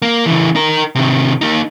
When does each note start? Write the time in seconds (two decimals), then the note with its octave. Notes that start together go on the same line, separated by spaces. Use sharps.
0.02 A#3
0.26 C#3 E3
0.56 D#4 A#4
0.95 C3 D#3
1.41 A#3 D#4